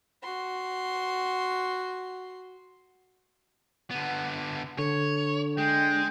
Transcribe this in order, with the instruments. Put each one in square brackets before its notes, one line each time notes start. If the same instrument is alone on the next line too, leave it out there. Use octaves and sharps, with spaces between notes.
[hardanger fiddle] F#4 C6
[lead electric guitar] D3 B3
[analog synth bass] D3 [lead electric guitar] C#5
[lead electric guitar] G#3 [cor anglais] G5